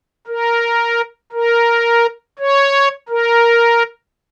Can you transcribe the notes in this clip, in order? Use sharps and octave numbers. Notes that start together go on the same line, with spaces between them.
A#4
A#4
C#5
A#4